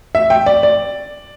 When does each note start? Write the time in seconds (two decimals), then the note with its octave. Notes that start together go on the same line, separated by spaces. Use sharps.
0.15 E5
0.30 G5
0.46 D5
0.63 D5